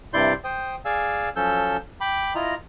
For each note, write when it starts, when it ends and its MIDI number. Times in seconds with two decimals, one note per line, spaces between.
0.14 0.33 43
0.14 0.33 48
0.14 0.33 64
0.14 0.33 74
0.14 0.33 84
0.14 0.33 91
0.44 0.76 72
0.44 0.76 79
0.44 0.76 87
0.85 1.29 68
0.85 1.29 74
0.85 1.29 77
0.85 1.29 80
0.85 1.29 88
1.36 1.77 53
1.36 1.77 54
1.36 1.77 61
1.36 1.77 69
1.36 1.77 88
1.36 1.77 91
2.01 2.33 79
2.01 2.33 83
2.01 2.33 86
2.35 2.54 64
2.35 2.54 65
2.35 2.54 75
2.35 2.54 82